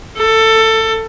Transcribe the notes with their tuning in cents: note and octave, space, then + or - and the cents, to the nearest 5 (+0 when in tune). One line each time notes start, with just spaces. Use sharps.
A4 +20